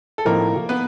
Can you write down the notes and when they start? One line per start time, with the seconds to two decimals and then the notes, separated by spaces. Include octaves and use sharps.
0.18 A4
0.25 A2 F3 A3 A#3 C4 D#4 A#4
0.69 B3 B4